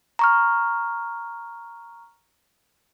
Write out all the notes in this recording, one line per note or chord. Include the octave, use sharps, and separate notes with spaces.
A#5 C#6 F6